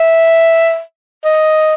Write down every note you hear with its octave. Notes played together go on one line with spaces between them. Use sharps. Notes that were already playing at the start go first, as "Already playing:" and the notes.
Already playing: E5
D#5